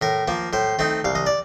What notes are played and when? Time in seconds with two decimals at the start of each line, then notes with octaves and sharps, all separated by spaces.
0.02 A2 A#4
0.28 F3 A#3
0.53 A2 C5
0.79 A3 C4 D#4
1.05 C2 F5
1.15 D#5
1.26 D5